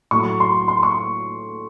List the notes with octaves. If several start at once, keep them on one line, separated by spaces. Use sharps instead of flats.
A2 F#3 C#6
C6
C6
C#6